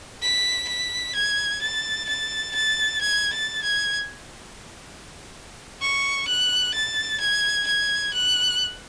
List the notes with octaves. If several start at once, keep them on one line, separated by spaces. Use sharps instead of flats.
B6
B6
G#6
A6
A6
A6
G#6
A6
G#6
C#6
F#6
A6
G#6
G#6
F#6